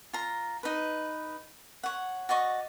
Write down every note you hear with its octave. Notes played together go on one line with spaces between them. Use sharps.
F4 A#5
D#4 B4
C#5 F#5
F#4 D5 D#5 C#6